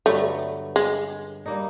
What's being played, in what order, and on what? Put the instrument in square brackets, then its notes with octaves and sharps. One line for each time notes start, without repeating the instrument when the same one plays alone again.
[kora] G2 D3 F#3 B3 [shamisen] A3
[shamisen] G#3
[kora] G3 A#3 D#4